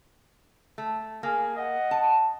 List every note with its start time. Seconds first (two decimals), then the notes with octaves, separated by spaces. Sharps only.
0.78 A3
1.23 A#3 G#4 G#5
1.57 D#5 F#5
1.91 A5